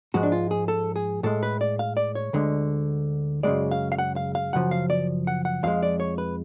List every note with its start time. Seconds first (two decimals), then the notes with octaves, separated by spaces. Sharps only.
0.14 G#2 F3 G#3 F#4
0.23 D4
0.32 F4
0.51 G#4
0.68 A4
0.96 G#4
1.23 A2 G#3 A4
1.43 B4
1.61 D5
1.79 F5
1.97 D5
2.15 C#5
2.33 D2 D3 G#3
3.43 F#2 C#3 F3 G#3 D5
3.71 F5
3.92 F5
3.99 F#5
4.16 F5
4.35 F5
4.53 F#2 C#3 F3 F#5
4.71 F5
4.90 D5
5.27 F#5
5.45 F#5
5.63 F2 F3 G#3 F5
5.83 D5
6.00 C#5
6.18 B4